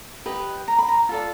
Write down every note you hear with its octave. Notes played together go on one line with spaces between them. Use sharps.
G4 B4 D#5
A#5
B5
A#5
F4 A4 D5